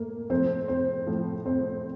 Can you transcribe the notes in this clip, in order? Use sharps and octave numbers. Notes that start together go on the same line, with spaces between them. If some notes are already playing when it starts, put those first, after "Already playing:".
Already playing: A2 A3 A#3 A#4
A2 F3 C4 C5
C4 C5
A2 F3
C4 C5